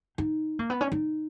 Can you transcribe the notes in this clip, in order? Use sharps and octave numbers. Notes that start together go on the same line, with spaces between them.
D#4
A#3
B3
C#4
D#4